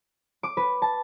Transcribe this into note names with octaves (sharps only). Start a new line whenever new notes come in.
D6
B4
A5